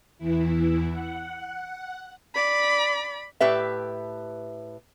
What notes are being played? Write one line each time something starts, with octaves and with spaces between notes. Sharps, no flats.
E2 E3 E4
F#5
D5 B5
A2 G4 B4 E5